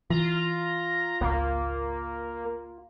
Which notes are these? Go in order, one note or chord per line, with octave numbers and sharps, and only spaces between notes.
E3 F4 A#5
G#1 C#2 A#3